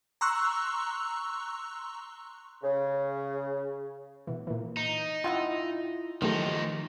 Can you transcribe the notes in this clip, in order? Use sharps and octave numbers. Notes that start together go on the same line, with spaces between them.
A#5 C6 C#6 E6 F#6
C#3
B2 E3
A#2 E3
D#4
E4 F4 D#5 F#5 G5
D#3 F3 F#3 A3 D#4 G4